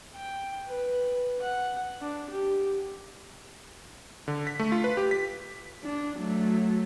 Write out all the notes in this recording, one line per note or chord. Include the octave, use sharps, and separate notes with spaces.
G5
B4
F#5
D4
G4
D3
B6
A3
F4
B4
G4
B6
D4
F#3 A3